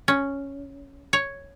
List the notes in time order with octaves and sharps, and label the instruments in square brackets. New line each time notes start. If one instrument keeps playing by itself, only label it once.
[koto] C#4
C#5